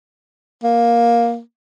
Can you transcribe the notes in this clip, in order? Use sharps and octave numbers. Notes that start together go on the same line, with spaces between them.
A#3